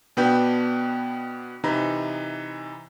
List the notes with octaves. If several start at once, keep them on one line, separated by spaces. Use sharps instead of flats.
B2 B3 D4 B4 G5 G6
C3 E3 D#4 A#5 B5